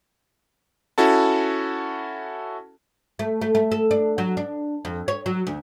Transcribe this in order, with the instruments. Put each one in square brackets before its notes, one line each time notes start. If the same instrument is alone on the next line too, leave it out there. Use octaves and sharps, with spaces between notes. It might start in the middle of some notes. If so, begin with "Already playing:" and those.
[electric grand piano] C#4 E4 F#4 A4 A5
[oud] A3
A3
A3
A4
D4
F#3
D4
F2
C#5
F#3
D2